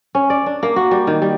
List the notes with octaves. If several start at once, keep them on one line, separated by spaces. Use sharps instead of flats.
C#4
D5
D4
A#3
F#4
G3
D#3
G3